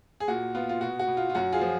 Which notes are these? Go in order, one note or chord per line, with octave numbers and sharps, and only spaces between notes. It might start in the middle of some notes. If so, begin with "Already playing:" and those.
G#4
A#2 F#4
B3 F4
F4
B2 F#4
F#4
B2
F4
F4
F#2 F#4
F4 G#4
F3